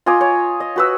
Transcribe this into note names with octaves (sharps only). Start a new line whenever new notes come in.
F4 D#5 G#5 D6
C#5
D#5
F#4 B4 E6